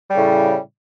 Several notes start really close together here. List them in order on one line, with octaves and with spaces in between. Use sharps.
G3 C#3 A2